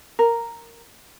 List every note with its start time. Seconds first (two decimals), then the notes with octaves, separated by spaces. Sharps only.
0.19 A#4